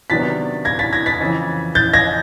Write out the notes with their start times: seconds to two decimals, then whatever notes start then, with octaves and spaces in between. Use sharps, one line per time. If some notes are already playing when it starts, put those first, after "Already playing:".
0.10 C3 D#3 F#3 B3 D4 A6 B6
0.65 G#6 A#6
0.79 A6 B6
0.93 G#6 A#6
1.06 A6 B6
1.20 F2 C#3 E3
1.75 G6 A6
1.94 G#6 A#6